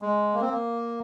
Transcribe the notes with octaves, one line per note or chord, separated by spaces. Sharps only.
G#3
A#3
C4
A#3